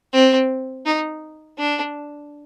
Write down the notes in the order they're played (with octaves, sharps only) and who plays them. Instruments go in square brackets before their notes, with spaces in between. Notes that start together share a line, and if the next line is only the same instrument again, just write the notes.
[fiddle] C4
D#4
D4